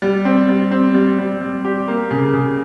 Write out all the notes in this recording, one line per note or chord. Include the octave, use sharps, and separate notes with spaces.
G3
C4
G3
C4
G3
G3
G3
G4
A#3
C#3
C#3